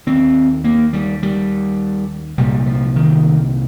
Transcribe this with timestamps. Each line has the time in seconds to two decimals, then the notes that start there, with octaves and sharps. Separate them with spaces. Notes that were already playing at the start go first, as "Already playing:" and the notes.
0.07 D#2 C4
0.64 A#3
0.93 G3
1.23 G3
2.38 C2 A#2 G3
2.66 F3
2.96 D#3